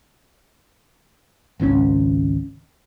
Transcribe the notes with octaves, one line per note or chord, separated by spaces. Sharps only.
G#1 C#2 C3 C#4